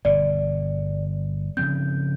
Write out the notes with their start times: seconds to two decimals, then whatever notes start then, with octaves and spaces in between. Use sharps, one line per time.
0.05 G1 B2 D5
1.57 C#3 F3 C4 G6